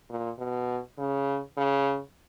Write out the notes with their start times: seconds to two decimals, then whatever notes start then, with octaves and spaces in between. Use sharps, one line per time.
0.10 A#2
0.39 B2
0.98 C#3
1.58 C#3